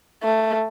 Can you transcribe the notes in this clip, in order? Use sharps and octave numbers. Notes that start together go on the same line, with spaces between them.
A3